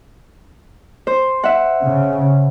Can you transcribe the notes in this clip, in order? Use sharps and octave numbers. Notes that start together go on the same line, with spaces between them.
C5
E5 F#5
C#3